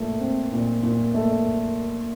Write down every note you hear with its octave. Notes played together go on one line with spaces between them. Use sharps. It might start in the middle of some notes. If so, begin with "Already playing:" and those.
Already playing: A#2 A3
C4
A#2
A#2
A3